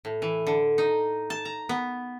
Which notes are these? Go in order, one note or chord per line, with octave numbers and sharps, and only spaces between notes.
A2
E3
D3
D#4
A5
A#5
B3